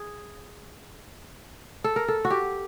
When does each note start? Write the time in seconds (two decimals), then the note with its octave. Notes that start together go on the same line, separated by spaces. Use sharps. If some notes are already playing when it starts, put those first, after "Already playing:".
Already playing: G#4
1.84 A4
1.96 A#4
2.08 A4
2.25 F#4
2.30 G4